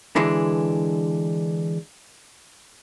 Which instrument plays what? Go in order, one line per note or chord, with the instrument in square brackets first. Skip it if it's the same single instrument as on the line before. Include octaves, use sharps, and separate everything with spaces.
[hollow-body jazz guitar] D3 E3 G#3 D4